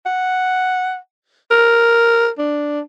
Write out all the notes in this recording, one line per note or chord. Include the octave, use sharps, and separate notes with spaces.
F#5
A#4
D4